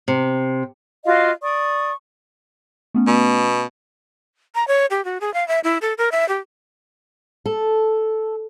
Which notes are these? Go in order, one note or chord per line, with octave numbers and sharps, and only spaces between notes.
C3
F4 F#4 D#5 F5
D5 C#6 D#6
A3 B3 C#4
B2
A#5
C#5
G4
F#4
G#4
F5
E5
E4
A4
A#4
E5
G4
A4